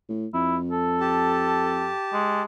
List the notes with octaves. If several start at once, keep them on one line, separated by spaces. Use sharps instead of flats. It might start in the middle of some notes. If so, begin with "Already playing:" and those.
A2
F2 E4
A4
G4 A5
G#3